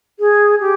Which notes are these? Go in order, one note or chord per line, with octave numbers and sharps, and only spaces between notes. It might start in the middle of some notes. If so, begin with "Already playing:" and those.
G#4
G4